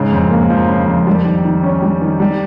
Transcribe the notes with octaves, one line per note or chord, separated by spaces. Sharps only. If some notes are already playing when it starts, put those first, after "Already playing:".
Already playing: G#2 C#3
F2
A#3
F3
C#3
F2
G3
D#3
D#3
C#4
G3
D#3
G3